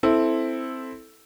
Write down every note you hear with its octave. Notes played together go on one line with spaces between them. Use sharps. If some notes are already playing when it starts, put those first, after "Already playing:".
C4 E4 A4